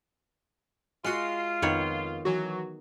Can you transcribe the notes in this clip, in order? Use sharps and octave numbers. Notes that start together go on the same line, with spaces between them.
G#3 F4 F#4 F6 C7 D#7
F2 D#3 B3 C#5
E3 F#3 F#4